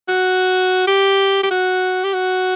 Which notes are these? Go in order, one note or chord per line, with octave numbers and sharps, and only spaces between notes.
F#4
G4
G4
F#4
G4
F#4